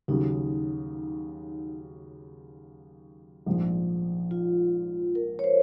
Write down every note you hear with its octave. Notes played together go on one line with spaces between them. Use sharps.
D#2 C#3 F#3 D#4
A#1 G#2 F3
F4
A#4
C#5
C5